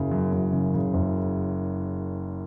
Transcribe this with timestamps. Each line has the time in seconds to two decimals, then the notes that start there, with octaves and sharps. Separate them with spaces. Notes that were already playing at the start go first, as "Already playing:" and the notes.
Already playing: F#1 C#3
0.12 F#2
0.33 F#2
0.53 C#3
0.74 C#3
0.94 F#1